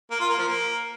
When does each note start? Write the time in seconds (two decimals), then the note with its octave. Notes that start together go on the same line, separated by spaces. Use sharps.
0.11 A#3
0.20 F4
0.29 A#3
0.39 F3
0.48 A#3